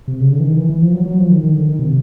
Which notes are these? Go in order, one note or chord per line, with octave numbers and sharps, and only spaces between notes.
C3
C#3
D3
E3
D#3
E3
E3
F3
F#3
F#3
F3
D#3
D#3
D3
D#3
C3